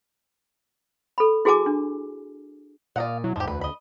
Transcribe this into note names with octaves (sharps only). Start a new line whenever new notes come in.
A4 B5
E4 F#4 G#4 G#5 A5 D6
D4
A#2 D5 D#5 F5 F#5
B2 F#3 E4
E2 G#2 F3 G4
D2 B4
D#5 B5